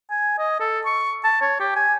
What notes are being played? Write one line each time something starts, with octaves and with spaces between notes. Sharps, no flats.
G#5
D#5
A4
C#6
A5
C#5
G4
G#5